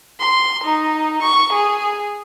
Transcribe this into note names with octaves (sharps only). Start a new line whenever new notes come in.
C6
D#4
C#6
G#4